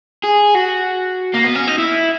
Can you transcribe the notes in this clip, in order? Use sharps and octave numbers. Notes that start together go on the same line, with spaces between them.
G#4
F#4
A#3
B3
C#4
D#4
E4